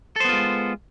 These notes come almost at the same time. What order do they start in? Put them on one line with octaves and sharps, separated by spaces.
A4 C5 B3 F4 G#3